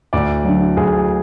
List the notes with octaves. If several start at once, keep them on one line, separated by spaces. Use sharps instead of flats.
D2 D5
D3 F#3
D2 G#4